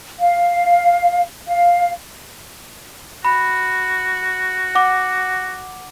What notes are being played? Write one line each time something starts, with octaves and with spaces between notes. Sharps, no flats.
F5
F5
F#4 B5
F#5 D6